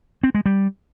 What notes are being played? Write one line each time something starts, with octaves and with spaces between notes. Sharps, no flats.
C4
G#3
G3